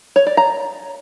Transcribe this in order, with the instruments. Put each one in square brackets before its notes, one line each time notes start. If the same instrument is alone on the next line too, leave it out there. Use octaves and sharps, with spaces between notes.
[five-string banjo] C#5
D5
A#5